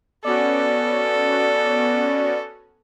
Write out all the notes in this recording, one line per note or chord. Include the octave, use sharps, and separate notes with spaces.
B3 C#4 F#4 A4 D5